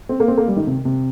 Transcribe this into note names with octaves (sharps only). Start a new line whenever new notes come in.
C4
A#3
C4
A#3
G3
D#3
C3
C3